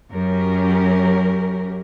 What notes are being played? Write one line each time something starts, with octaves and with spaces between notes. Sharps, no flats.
F#2 F#3 C#4 G4 A#4